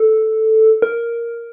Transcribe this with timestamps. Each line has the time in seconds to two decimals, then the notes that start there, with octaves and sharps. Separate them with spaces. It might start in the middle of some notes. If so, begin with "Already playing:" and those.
Already playing: A4
0.82 A#4